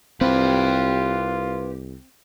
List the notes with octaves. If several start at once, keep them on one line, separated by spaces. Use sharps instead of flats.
C2 C4 F4 G4 B4